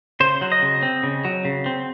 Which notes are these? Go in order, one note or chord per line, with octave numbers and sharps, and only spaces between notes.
C#3 C5
F#3
D#5
C#3
C4
C#3
F#3
C#3
C4